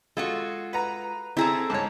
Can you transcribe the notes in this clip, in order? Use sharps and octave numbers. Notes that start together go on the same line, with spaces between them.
G#3 F4 F#4 A4 C#6
B4 F#5 A#5
C4 E4 G#4 A4 E5 A#5
C#2 G#2 C#5 A5